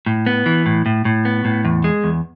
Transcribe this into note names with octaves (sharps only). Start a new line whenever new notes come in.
A2
B3
E3
A2
A2
A2
B3
A2
E2
G#3
E2